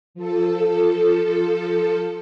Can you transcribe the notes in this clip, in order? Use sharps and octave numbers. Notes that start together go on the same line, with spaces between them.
F3 A4